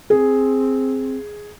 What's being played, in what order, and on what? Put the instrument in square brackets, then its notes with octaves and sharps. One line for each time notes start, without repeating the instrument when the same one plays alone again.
[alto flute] C4 [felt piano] G#4